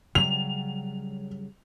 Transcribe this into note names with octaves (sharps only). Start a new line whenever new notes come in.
C#3 F#3 G3 F7